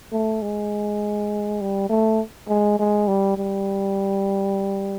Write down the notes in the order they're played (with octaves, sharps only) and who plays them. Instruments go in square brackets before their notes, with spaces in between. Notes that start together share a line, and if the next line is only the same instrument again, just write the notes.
[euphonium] A3
G#3
G3
A3
G#3
G#3
G3
G3